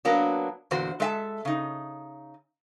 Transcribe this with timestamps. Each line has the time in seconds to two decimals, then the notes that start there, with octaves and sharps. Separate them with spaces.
0.05 F#3 A#3 B3 D4
0.71 E2 A#2 D3 F#4 C5
1.00 G#3 A4 E5 G#5 A5
1.45 C#3 D#4